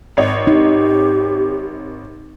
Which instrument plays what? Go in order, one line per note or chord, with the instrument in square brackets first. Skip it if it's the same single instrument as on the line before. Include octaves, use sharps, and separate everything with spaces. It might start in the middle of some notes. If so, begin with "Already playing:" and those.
[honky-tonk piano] G#1 C#5 D#5
[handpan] D#4 [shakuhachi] G4